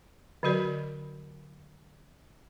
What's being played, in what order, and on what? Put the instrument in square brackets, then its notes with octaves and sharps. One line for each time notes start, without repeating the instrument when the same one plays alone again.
[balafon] D3 F#3 F#4 A#4 D5